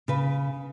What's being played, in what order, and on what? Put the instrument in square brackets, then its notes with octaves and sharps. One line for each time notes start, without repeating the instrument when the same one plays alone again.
[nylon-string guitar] C#3 B4